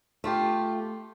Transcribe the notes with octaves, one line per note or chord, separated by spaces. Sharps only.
A3 F4 G4